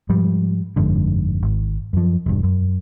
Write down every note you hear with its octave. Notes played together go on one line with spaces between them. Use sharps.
G#2 F3 G3
G1 F2 G#2 D3
G#1
F#2 F3
E1 G2
F#2